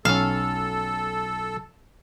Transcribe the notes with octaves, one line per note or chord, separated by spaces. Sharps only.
B1 C#4 A4 F5